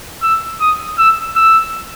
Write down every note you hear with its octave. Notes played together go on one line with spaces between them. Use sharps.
E6
D#6
E6
E6